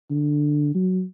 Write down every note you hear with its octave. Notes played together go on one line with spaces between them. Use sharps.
D3
F#3